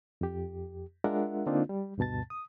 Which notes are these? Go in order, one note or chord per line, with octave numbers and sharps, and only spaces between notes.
F2 G4
G#3 D4 F4 A#4 E5 F#5
D3 A#3 C4 D4 D#4 F4
G3
D2 G2 B2 A5 A6
D#6